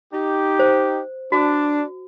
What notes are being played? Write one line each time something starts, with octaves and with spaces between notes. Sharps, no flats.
D#4 G4
C5
D4 F#4